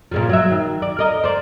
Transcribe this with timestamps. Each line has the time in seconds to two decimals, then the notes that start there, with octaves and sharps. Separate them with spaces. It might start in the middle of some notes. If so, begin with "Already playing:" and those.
0.12 A#2 C#3 F3
0.29 F#3 E5
0.51 D#3
0.82 D5
0.99 A#4 D#5
1.24 C5 D5